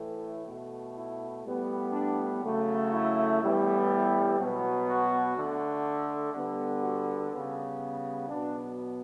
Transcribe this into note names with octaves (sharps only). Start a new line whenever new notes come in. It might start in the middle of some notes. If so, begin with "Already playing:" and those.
Already playing: A2 E3 A3
B2
A3
E4
A2 G3 B3
D4
C#3 F#3 A3
E4
A2 E3 G3 B3
B2 F#3 B3
F#4
D3 A3
D3 G3 B3
F#4
C#3 G3 B3
B2 F#3 B3 D4